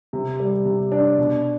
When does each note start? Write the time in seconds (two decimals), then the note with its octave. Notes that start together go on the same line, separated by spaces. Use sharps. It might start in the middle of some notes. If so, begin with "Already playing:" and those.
0.13 C3
0.40 G3
0.65 C3
0.92 D4
1.18 B2